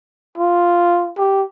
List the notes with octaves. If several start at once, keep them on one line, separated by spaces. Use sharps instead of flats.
F4
G4